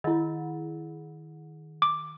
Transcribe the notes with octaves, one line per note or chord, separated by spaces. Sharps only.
D#3 E4 D#5
D6